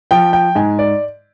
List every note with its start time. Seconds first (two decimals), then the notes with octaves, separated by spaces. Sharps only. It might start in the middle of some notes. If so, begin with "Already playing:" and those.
0.11 F3 G5
0.33 G5
0.55 G#2 G#5
0.79 D5